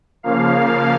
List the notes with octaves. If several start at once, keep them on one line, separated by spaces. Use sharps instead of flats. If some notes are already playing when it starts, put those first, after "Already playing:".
C#3 F3 A#3 F5